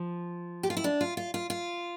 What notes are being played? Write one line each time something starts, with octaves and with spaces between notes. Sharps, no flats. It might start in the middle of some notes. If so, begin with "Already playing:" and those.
Already playing: F3
G4
F4
E4
D4
F4
F4
F4
F4